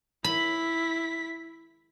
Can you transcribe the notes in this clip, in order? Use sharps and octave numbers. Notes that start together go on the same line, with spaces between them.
E4 B5 B6